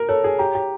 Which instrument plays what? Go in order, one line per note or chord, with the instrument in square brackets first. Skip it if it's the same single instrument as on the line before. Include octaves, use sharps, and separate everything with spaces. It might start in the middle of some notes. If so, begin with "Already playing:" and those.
Already playing: [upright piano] A#4
[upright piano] A4 [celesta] C#5
[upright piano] G#4
[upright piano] G4 [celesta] A#5
[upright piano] G4